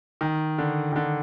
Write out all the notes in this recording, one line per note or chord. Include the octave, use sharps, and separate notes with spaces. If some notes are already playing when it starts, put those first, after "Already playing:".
D#3
D3
D#3
D3